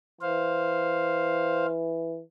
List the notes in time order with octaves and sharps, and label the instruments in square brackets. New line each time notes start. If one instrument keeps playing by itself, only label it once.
[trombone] E3 [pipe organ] C5 F5